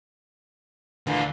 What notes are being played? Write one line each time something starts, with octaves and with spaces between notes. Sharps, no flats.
D2 A#2 D3 E3